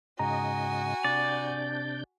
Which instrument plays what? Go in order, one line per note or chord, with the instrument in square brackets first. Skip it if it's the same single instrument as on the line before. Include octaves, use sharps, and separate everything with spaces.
[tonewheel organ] G#2 C#3 D#5 [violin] F#4 G#5 [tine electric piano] A#5
[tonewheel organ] C3 D4 G6 [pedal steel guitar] D5